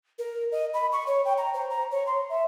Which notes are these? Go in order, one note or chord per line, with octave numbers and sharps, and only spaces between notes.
A#4
D#5
B5
C#6
C#5
G5
A#5
C5
A#5
C#5
C6
E5